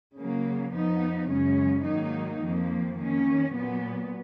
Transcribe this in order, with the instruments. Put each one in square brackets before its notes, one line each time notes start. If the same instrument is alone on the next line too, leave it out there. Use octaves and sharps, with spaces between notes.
[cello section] C#3 F#3 A#3
F2 F3 B3 D#4
F#2 C#3 G#3 C#4
G#2 D#3 F#3 A#3 D#4
F2 F3 A#3
D#3 A#3 C#4
A#2 F#3 B3